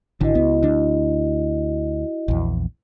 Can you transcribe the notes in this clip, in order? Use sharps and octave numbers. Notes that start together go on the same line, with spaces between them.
G#1 D3 E4 F#4 D#5
C#2 B3
D2 D4
A#1 E2